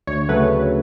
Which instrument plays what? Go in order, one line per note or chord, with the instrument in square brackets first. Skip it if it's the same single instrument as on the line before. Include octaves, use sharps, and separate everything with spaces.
[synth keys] D2 C#5
C#3 F#3 A3 B4
D2